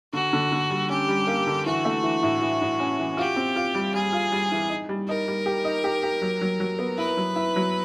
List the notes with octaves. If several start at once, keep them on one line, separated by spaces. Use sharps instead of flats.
D3 F#4
D3
D3
G3
C#4 G4
G3
A#3
D3
E3 F#4
A3
E3
A2
E3
A2
C#4
E3
F4 G4
C4
F4
G3
G3 G#4
F4
G3
E3
D#4
G3
D#4 A#4
G3
G4
D#4
G4
G4
F#3
F#3
F#3
B3
E4 B4
F#3
E4
F#3